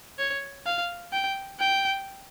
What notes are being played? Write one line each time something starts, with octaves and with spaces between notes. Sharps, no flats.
C#5
F5
G5
G5